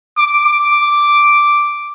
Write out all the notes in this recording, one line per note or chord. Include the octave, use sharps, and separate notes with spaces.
D6
D6